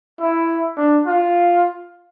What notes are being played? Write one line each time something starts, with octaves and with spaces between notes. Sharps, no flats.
E4
D4
F4